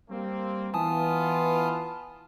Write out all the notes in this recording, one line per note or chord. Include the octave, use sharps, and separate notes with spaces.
G3 A#3 C4
E3 B3 F4 G#5 A5 D#6